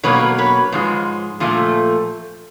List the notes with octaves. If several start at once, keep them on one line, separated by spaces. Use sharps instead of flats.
B2 F#3 A#3 B4 C#5
B4 C#5
G#2 F3 G#3
A#2 F3 A3